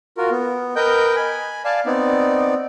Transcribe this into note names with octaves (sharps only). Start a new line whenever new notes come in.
F4 F#4 A#4
B3
A#4 B4 D#5 G5 G6
G#5 B5
D5 F5 G#5 A5
B3 C4 D#4 D5